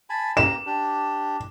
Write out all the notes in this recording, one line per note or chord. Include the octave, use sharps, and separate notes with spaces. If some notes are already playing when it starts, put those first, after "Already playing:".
G#5 A5 B5
A#3 G4 A#5 E7
D4 G4